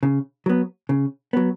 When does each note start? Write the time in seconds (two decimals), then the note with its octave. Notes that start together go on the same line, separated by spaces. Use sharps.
0.03 C#3
0.46 F#3 B3
0.89 C#3
1.33 F#3 B3